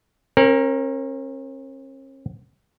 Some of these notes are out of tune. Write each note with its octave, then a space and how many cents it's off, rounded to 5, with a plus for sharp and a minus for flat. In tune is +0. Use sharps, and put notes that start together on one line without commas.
C#4 -45 A#4 +0